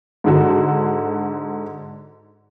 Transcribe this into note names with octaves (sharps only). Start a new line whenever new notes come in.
G#2 D3 F#4